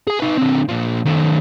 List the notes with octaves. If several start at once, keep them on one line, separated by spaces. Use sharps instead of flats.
G#4 G#5
D#4 B4
D3 C4
A#2 F3
D#3 A3